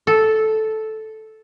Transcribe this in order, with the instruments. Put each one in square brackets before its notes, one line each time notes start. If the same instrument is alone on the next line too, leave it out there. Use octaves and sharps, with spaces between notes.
[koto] A4